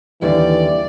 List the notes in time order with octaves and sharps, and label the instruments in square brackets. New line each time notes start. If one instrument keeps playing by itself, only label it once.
[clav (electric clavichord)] D#2 D3 G3 [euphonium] E3 [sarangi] D5